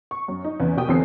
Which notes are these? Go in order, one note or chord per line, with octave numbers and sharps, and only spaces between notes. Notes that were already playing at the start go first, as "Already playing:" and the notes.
C#6
F#2
D#4
E2 C#3 B3
B2 A#3 G4 G5 D#6
G1 E2 E3 C4 A4 C7